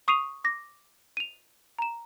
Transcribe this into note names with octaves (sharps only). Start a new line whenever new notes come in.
C#6 D#6 C7 D#7 F7
D6 A#6
D#7 F7
A#5 E7